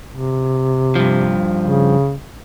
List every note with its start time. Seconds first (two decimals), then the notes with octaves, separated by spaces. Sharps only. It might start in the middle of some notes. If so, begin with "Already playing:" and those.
0.11 C3
0.95 G2 F3
1.62 C#3